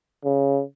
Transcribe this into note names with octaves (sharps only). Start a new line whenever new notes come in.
C#3